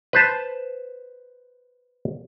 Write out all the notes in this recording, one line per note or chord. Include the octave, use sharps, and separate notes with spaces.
B4 C5 A5